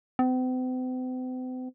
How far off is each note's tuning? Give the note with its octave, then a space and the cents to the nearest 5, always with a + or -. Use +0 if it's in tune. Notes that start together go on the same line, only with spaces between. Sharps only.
C4 -45